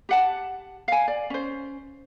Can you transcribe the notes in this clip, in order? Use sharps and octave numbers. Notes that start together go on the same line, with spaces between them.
G4 F#5 A5
F5 G#5
D5
C#4 C5